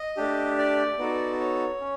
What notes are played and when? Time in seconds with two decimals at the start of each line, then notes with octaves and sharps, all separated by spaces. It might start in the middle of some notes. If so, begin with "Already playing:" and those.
Already playing: D#5
0.17 A3 D4 G4
0.58 D5
0.99 B3 D#4 F#4 A4
1.40 C#5
1.80 C#4